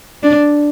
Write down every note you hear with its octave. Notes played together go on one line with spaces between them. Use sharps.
D4